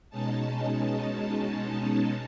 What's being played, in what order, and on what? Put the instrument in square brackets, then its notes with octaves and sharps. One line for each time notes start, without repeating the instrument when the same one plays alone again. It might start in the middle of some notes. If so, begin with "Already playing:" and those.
[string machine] B2 G#3 C#4 D#4 A5